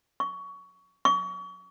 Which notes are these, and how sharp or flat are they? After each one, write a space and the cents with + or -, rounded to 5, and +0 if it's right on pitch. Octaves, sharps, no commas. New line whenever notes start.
C#6 +20
C#6 +35